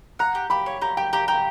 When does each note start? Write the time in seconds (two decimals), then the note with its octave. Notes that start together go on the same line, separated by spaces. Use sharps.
0.19 F#5 A#5
0.35 G4
0.50 G4 B5
0.66 C#5
0.82 G4 A#5
0.97 G4 G5
1.13 G4 A#5
1.28 G4 A#5